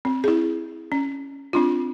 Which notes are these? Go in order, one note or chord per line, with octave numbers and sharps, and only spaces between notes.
C4
E4 G#4
C#4
C4 D4 F4